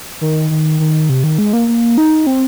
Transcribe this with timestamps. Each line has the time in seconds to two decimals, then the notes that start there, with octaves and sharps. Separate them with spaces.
0.21 D#3
0.50 D#3
0.80 D#3
1.09 C3
1.24 D#3
1.38 G#3
1.53 A#3
1.68 A#3
1.98 D#4
2.27 C4